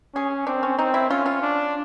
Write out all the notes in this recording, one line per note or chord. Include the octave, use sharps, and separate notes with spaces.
C#4 G#4
C4 D4
C#4
C4 D#4
E4
C#4 F4
F4
D4